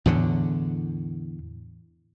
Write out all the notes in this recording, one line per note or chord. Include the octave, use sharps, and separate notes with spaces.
E2 A2 D3